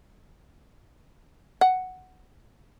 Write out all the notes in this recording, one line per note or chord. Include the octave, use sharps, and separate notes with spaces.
F#5